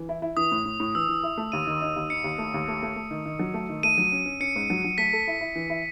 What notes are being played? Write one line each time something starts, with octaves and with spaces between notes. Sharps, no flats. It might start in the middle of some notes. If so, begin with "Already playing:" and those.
Already playing: E3
E4
E4
E3 D#6
A2
A2
A2
E3 E6
E3
E4
A3
D#2 D#7
D#3
D#4
D#2
D#4 C#7
D#2
A3
D#2
A3
A3
A3
D#3
D#3
F#3
A3
D#3
A3 D#7
F#3
C#4
C#4
C#4 C#7
G#2
F#3
F#3
A3 B6
A4
E4
E4
E3
E4